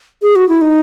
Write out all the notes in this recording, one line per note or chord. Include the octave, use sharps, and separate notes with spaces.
G#4
F#4
E4
D#4